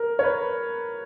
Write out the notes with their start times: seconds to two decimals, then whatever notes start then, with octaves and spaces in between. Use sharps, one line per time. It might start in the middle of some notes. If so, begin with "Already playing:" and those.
Already playing: A#4
0.19 C#5
0.23 B4